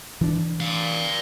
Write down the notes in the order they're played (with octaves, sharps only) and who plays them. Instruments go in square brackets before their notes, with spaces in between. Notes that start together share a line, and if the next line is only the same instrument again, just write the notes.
[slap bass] E3 D4
[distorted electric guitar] D5 F5